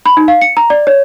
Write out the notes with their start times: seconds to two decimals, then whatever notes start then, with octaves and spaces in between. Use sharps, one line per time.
0.06 B5
0.17 D#4
0.28 F5
0.42 C#7
0.57 A#5
0.70 D5
0.87 C#5